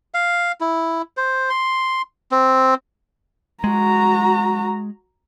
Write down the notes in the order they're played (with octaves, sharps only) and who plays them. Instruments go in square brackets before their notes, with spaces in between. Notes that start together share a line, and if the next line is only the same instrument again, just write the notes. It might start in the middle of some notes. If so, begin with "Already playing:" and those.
[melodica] F5
E4
C5
C6
C4
[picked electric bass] G#3 [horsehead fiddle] F#4 A#5